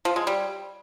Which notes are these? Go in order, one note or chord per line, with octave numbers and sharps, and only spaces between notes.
F3
G#3
G3